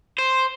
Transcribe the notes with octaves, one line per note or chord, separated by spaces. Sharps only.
C5